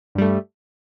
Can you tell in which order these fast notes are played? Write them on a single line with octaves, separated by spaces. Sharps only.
G2 G3 A3